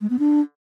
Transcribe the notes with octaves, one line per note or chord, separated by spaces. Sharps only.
G#3
B3
D4